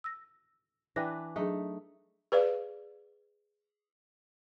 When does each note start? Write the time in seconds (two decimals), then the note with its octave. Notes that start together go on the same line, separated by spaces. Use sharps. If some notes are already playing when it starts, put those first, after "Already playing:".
0.04 E6 A#6
0.96 E3 D4 B4 G5 A#6
1.36 F#3 A3 D4 D#4 G#4
2.32 G#4 B4 D5 F5